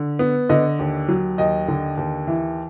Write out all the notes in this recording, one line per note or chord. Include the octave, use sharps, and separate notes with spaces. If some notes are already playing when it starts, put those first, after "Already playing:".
Already playing: D3
B3
D3 D#5
D#2
F#3
D#2 D#5
D3
D#2
E3